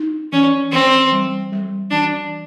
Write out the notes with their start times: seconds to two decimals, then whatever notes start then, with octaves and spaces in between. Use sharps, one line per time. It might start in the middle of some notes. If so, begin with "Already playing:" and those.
Already playing: D#4
0.32 E3 C#4
0.72 E3 C4
1.12 G3
1.52 G3
1.91 E3 D4